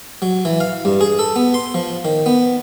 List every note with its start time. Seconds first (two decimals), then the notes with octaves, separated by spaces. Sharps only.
0.22 F#3
0.45 E3
0.60 F5
0.85 G2
1.01 G#4
1.19 A4
1.36 B3
1.54 C6
1.74 F3
2.05 D#3
2.26 B3